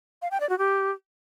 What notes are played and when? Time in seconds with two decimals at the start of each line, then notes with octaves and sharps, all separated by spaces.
0.22 F5
0.31 G5
0.40 D5
0.49 F#4
0.59 G4